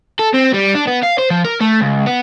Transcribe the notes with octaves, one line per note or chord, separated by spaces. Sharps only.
A4
C4
G3
D4
B3
F5
C5
F3
A#4
A3
C#2
B3